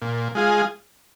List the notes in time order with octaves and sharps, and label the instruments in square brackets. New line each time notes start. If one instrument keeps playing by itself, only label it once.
[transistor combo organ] A#2
G#3 F4 G#4